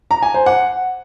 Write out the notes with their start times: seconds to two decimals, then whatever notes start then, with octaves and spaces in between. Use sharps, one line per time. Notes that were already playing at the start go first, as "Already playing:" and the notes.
0.11 A#5
0.23 G#5
0.34 C5
0.46 F#5